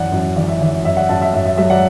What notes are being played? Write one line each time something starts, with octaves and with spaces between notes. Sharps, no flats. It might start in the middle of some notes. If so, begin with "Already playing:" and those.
Already playing: F#2 E3 D5 F#5
F#2
E3 D5
E5
E3 D5
F#2 E5
D5 F#5
F#2 E5 A5
E5
F#2 E5
E5
F#3 E5
D5 F#5